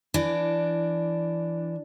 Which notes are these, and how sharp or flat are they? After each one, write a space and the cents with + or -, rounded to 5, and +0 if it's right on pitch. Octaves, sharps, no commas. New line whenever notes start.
E3 +20 D4 +0